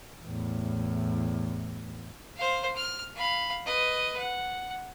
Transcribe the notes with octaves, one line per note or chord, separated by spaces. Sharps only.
E2 A2
C5 F5
F6
F5 B5
B4 D#5
F#5